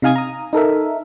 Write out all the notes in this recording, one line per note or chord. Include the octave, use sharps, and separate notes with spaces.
C3 D#4 F5 G#5 D#6 G#6
A#5 D#6
D#4 A4 A#4 E5